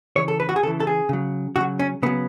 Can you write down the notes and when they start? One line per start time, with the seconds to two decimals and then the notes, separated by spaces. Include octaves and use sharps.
0.16 C#3 E3 C#5
0.28 A4
0.40 B4
0.49 F#4
0.56 G#4
0.63 C#3 A4
0.67 E3
0.80 A4
0.87 G#4
1.09 C#3 F#3
1.56 C#3 F#3 F#4
1.79 C#4
2.02 C#3 F#3 B3